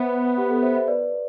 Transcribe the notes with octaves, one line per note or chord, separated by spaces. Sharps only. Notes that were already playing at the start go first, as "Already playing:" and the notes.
Already playing: B3 C5 E5
G4
A4
C5 E5
C5 E5
B4 D5